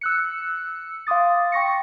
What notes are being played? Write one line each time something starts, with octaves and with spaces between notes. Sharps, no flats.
E6 F#6 C#7
F5 C6 D6 D#6 A6
G5 C#6 A#6 C#7